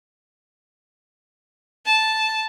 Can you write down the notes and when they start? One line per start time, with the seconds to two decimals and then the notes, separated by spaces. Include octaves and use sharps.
1.86 A5